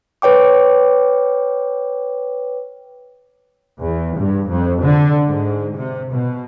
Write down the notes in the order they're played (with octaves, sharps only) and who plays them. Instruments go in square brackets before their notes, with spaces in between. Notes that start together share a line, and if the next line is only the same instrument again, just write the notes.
[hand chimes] B4 C#5 G5 D6
[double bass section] E2
G2
F2
D3
G#2
C3
B2